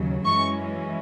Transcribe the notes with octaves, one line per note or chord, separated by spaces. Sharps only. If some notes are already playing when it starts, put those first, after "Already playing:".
Already playing: D#2 C#3 F#3
F#2 E3 G#3 C#4 C#6